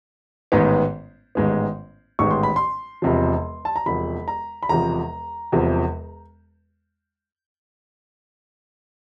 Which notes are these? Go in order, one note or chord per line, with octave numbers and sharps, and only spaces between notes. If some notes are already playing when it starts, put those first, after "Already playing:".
A1 G#2 D#3 G#3 B3
A1 G#2 D#3 G#3 B3
A1 G#2 D#3 G#3 B3 C#6
C6
B5
C6
E1 E2 C3 F3
A5
A#5
E1 E2 C3 F3 B5
A#5
B5
E1 E2 C3 F3 A#5
E1 E2 C3 F3